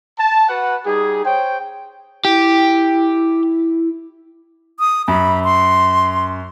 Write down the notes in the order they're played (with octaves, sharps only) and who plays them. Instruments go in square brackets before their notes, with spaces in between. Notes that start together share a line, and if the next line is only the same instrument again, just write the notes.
[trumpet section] A5
F#4 B4 F#5
G3 D#4 G#4
C5 C#5 G5
[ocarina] E4 [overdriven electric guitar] G4
[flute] D#6
[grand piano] F#2 [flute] B5
[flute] C6